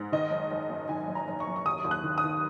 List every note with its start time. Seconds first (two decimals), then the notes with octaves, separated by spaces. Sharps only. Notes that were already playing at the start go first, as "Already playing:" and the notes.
Already playing: G#2
0.12 D#3 D#5
0.31 F#1
0.51 F#1
0.70 F#2
0.89 D#3 G#5
1.08 F#1
1.15 A#5
1.27 F#1
1.40 C#6
1.47 F#2
1.56 C#6
1.66 D#2 D#6
1.84 D#2
1.91 F#6
2.04 D#3
2.18 D#6
2.24 D#3